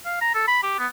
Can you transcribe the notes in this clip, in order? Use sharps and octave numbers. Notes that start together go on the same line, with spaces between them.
F5
A#5
A4
B5
G4
B3